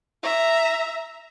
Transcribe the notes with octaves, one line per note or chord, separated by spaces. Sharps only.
E5 A#5